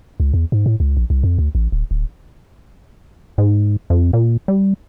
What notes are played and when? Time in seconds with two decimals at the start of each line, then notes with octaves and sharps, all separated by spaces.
0.20 C#2
0.34 E2
0.52 G#2
0.66 A2
0.80 C#2
0.97 A#1
1.10 C2
1.23 F2
1.38 D2
1.55 A1
1.72 D1
1.91 D1
3.38 G#2
3.90 F2
4.13 A#2
4.48 G3